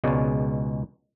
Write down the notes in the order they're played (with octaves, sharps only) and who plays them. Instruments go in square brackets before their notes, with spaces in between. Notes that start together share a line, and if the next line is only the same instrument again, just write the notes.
[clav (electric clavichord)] C#2 B2 G#3 C#5 D5